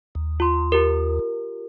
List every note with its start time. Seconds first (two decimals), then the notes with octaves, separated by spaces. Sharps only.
0.15 D#2
0.40 F4 C6
0.72 F4 G4 A#4